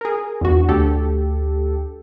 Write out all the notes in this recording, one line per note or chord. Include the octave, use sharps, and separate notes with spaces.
G#4 A#4
E2 G2 F#4
D2 G4 A4